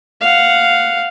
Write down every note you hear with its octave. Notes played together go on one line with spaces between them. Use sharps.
F5 F#5